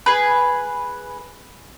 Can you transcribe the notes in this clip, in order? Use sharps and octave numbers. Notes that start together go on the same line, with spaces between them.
G#4 B4